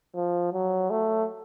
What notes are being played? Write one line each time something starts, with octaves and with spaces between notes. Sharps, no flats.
F3
F#3
A3